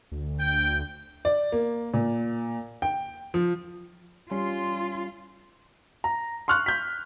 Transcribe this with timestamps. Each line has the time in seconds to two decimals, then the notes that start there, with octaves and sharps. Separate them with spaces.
0.12 D2
0.41 G5
1.25 D5
1.52 A#3
1.94 A#2
2.82 G5
3.34 F3
4.31 G3 C#4 F4 C6
6.04 A#5
6.48 C6 C#6 F6 F#6
6.66 G6 B6